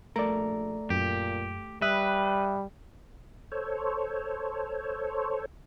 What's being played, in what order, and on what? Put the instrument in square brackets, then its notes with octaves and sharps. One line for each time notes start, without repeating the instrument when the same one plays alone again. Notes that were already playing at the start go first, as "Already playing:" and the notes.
[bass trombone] A#1 [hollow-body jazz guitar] A3 A#4 [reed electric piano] D5 A#5
[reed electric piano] F#2 [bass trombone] A#2 [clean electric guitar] G4
[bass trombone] G3 [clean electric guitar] B4 [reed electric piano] E5 D#6 F#6
[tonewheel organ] A4 C5 C#5